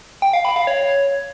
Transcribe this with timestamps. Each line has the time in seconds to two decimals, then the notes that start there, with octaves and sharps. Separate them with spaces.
0.22 G5
0.33 F5
0.45 B5
0.56 F5
0.67 C#5